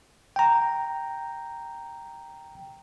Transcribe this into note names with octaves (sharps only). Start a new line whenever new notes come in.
G5 A#5